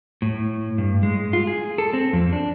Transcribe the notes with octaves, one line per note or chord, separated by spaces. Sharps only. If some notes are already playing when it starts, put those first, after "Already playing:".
A2
G2
G#3
F4
G#4
A4
C4
F2
D4